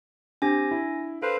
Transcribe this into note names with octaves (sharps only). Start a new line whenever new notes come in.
C4 D4 G4 G#5 A#6
E4
A4 B4 C5 F5